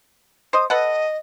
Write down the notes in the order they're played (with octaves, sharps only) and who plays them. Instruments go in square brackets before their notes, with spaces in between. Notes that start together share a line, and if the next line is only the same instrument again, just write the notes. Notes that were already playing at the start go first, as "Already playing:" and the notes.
[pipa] C5 D#5 [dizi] D#6
[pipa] A4 B4 F#5 [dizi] D#5